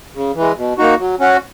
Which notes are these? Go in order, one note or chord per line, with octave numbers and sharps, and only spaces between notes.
C#3
E3
G#3
B2
A#3 D#4 F#4
F#3
C#4 F#4